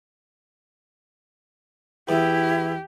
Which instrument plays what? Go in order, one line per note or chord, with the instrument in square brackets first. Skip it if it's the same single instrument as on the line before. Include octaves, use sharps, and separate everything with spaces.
[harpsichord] E2 [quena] E4 [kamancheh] G4